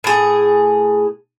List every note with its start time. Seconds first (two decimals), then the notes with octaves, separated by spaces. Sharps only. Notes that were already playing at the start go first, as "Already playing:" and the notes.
0.04 A2 G#4